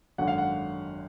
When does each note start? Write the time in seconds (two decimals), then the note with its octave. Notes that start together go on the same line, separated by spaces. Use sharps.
0.18 G#1 F#2 D3 F#5
0.28 F5
0.38 F#5